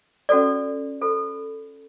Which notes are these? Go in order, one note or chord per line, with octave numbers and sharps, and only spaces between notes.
C#4 F#4 A4 C5 D5
F4 A4 C5